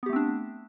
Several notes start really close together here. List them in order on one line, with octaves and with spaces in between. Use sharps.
B3 G4 A3 C4 D4